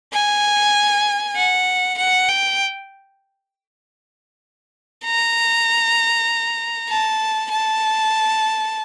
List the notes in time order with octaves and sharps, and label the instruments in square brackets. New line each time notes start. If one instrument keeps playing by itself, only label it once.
[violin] G#5
F#5
F#5
G5
A#5
A5
A5